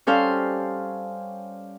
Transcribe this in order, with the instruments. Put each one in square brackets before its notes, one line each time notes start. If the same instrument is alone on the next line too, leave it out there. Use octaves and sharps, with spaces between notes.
[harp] G3 C#4 A4 C5 F5